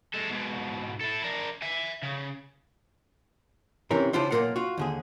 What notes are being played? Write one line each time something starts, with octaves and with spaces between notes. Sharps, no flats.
G#3 A4
G#2 B2
E4 A4
D4 A#4
E5 G#5
C#3
C3 E3 C4 C#4 A#4
C#3 D4 E4 F4 C5
B1 A#2 C#3 A#4 F5 F#5
F4 F#4
D#2 D3 G#4